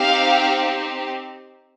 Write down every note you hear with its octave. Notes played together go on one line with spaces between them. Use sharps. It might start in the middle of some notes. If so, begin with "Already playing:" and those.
Already playing: C4 D#4 G4 F5